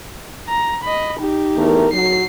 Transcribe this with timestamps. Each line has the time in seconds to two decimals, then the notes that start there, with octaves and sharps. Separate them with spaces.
0.49 A#5
0.84 D#5 B5
1.20 D#4 G4
1.57 E2 A3 A#4
1.93 F#3 C7